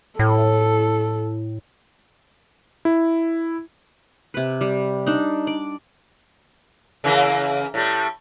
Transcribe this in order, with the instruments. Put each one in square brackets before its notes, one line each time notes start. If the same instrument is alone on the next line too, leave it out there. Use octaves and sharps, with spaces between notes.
[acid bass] A2 [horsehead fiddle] A4
[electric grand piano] E4
[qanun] C3 B4
G3
D4 D#4
D5
[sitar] C#3 E3 A#3
A2 G3